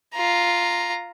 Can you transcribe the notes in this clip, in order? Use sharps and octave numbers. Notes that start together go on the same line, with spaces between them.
F4 A#5